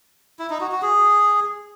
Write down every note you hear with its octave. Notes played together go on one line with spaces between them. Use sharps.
E4
D#4
F#4
F#4
G#4